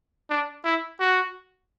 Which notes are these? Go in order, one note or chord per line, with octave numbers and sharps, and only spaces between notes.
D4
E4
F#4